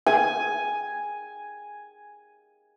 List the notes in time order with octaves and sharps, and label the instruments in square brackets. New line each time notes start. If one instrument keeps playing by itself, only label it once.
[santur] G#5